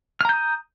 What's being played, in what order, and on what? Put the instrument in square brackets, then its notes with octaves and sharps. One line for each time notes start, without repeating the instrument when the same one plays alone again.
[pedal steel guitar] F6
A#5
G6
D#6